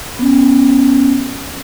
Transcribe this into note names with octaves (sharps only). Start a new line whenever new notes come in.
B3 C#4